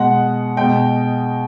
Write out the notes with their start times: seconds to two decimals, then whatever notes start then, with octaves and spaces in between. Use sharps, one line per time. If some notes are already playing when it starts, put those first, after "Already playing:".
Already playing: B2 G#3 F#5
0.57 B2 G#3 G5